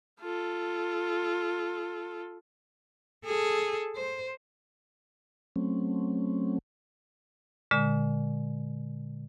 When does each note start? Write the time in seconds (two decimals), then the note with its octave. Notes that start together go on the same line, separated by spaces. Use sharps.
0.21 F4 A4
3.25 G#4 A4
3.95 C5
5.56 F#3 A3 C4 C#4
7.71 A#2 D3 G#3